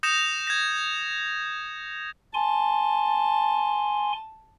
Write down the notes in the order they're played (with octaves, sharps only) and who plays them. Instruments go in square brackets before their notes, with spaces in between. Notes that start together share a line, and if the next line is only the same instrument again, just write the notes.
[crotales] D#6 G6 A#6 C#7 E7 F7
G#6 A#6
[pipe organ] G#5 C6 [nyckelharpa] A5